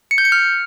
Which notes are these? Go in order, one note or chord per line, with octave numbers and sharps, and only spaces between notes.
C#7
G6
C#7
F6